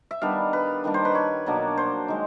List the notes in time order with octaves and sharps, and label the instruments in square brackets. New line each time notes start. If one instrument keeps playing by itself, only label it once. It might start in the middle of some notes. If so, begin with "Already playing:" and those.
[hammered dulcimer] E5
D#3 G3 B3 D4 F5
B4
D#3 G3 A#3 D4
C5
B4
C#5
B2 F#3 A#3 D4
C5
D#3 G#3